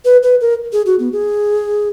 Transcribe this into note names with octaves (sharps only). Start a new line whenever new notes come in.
B4
B4
A#4
G#4
F#4
B3
G#4